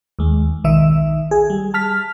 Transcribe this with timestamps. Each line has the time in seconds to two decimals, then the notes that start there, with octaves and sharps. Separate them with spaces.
0.19 D#2 G#3
0.64 B1 D#3 D#4 E5
1.31 G#4
1.50 G3
1.74 A5 F6 B6